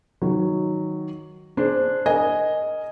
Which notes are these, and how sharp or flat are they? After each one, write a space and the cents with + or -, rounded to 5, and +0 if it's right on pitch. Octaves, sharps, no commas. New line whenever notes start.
D#3 +0 F#3 +0
D4 +0 G#4 +0 C5 +0
A#4 +0 D#5 +0 G#5 +0